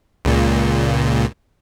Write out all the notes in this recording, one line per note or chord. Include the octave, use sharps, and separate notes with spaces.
C#2 A#2